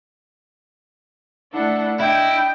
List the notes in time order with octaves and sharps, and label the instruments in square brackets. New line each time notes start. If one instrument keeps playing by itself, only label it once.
[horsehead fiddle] A3 E4 [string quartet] D4 A4 F#5
[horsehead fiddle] D4 [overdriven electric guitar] E4 [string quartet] D#5 [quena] G5